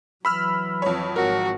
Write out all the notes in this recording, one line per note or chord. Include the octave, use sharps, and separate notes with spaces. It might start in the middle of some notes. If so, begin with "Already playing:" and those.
E3 F#3 B5 E6 F6
F2 C#5
G#1 F#4 A#4